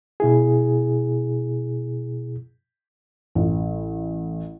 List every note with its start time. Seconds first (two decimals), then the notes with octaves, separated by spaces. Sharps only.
0.20 B2 E4 G#4
3.35 A1